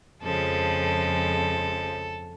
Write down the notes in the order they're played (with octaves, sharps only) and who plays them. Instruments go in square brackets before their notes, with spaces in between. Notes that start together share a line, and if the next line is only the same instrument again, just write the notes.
[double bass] F2 [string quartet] C#3 F3 G#3 [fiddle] A4